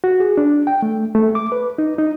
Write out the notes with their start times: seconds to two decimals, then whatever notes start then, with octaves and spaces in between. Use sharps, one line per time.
0.04 F#4
0.20 G#4
0.37 D4
0.67 G5
0.82 A3
1.15 A3
1.35 D6
1.52 B4
1.78 D#4
1.98 D#4